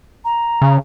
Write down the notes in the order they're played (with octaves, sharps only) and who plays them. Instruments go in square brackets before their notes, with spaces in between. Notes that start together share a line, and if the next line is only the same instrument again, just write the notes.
[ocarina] A#5
[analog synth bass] C#3